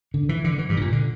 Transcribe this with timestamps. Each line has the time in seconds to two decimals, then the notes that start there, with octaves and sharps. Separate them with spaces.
0.14 D3
0.29 E3
0.44 D3
0.59 E3
0.69 G2
0.77 A2
0.81 A#2
0.92 D3